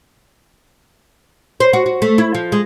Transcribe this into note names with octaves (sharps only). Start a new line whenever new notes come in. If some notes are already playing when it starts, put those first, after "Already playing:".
C5
F#4
F#4
A3
E4
F3
G#3